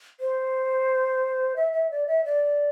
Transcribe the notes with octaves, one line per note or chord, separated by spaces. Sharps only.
C5
E5
E5
D5
E5
D5